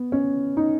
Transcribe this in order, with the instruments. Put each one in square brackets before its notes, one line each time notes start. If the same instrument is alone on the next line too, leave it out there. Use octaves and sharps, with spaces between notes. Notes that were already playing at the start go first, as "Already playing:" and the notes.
Already playing: [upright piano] B3
C#4
D#4